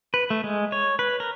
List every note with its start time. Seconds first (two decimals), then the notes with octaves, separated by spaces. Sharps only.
0.14 B4
0.30 A3
0.44 G#3
0.72 C#5
0.99 B4
1.20 A#4